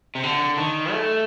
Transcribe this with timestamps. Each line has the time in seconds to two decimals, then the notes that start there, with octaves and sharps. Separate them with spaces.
0.15 C3
0.23 D3
0.57 D#3
0.92 A3